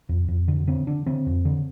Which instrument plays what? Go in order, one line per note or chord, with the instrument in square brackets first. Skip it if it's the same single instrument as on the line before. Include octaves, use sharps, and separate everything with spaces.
[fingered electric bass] F2
F2
D3
D3 C4
D3 D4
D3 C4
F2
D3